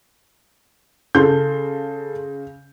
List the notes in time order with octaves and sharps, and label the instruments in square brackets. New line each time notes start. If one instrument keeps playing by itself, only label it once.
[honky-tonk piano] C#3 [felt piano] A4 C6 G6